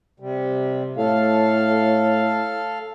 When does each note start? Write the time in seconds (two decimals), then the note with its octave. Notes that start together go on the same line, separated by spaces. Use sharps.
0.20 C3 G3
0.97 A2 A4 F5